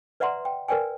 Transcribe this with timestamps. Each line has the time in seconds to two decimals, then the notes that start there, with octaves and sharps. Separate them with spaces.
0.20 B4 D5 E5 F#5 A#5 C6
0.45 G5
0.68 A#4 B4 D5 G5 G#5